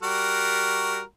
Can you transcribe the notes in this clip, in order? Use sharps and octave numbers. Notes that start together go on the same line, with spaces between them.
G3 F#4 A#4